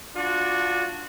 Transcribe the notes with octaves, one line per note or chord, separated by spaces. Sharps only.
D4 F4 F#4